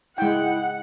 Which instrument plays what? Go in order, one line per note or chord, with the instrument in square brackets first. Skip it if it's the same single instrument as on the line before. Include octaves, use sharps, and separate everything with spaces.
[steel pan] G#3 G5 [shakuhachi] E4 [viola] F#5